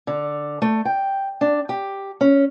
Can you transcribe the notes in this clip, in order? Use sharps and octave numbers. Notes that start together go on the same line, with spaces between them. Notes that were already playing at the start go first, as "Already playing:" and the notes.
D3
A3
G5
D4
G4
C#4